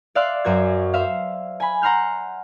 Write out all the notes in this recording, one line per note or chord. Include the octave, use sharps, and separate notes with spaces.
D5 E5 F5 C6 E6 F#6
F#2 F#4 C5 G#6
C5 E5 F5
G#5 B5
F#5 A#5 C6 F6 G6